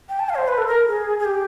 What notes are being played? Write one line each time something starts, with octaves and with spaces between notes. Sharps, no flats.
G5
A5
F5
C#5
C5
B4
A4
A#4
G#4
G#4
G4